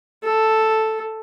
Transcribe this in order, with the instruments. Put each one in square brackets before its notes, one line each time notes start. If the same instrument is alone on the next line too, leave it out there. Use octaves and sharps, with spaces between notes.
[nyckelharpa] A4